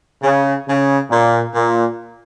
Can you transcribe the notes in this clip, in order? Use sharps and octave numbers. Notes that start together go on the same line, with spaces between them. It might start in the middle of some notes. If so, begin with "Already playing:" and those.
C#3
C#3
A#2
A#2